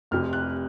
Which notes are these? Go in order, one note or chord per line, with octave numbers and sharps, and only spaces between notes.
F1 F2 C3 F6
F#6